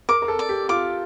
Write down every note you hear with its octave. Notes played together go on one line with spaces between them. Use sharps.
A#4 D6
A#4
A4
D5
G4
F4 D6